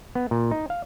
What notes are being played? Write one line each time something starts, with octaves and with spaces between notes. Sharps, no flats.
B3
A#2
D#4
F5